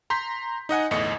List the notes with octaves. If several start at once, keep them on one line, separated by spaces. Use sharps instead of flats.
A#5 C6 G6 B6
D#4 D#5 F#5 G#5
G1 E2 A2 D#5 C#7